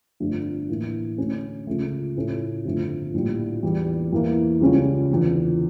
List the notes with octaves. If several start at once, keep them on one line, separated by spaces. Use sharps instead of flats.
G1 F2 D3 A3 D4
A2 E3 A#3
D2 D3 A3 C#4
C#2 C#3 F3 A3
A2 F3 C#4 E4 A4
G1 F2 D3 A3
A#1 A2 G3
E2 E3 G3
E2 E3 A#3 E4
C#2 C#3 G3 C#4 F4
E2 D3 F3